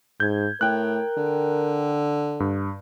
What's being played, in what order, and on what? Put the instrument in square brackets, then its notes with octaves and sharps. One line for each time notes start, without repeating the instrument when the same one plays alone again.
[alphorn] G#2 [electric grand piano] G6 G#6
[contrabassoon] A2 [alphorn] A#4 [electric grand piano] G5 F#6
[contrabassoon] D3
[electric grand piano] G2